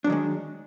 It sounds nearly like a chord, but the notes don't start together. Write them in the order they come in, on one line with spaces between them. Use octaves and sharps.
D4 F#3 D#3 G#3